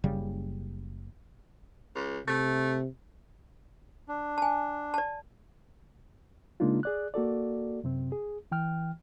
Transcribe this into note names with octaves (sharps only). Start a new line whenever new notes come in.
F#1 C#3 G3
C#2
C3 A3
D4
G#5 A5
D5 A5
C#3 G#3 A#3 D4 D#4 F4
G#4 D5 F#6
A#3 F#4 A4 D5
F#2 C3 C4
G#4
E3 G5 F6